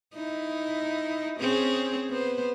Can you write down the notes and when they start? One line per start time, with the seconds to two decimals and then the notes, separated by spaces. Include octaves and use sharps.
0.14 D#4 E4
1.40 C4 C#4 G#4
2.10 B3 C5